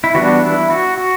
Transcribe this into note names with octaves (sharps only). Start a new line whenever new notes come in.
E4
E3 G3 B3 D4 F#4
E4
F#4
F#4